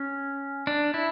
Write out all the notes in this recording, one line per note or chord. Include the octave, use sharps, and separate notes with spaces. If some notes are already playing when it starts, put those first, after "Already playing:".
Already playing: C#4
D4
E4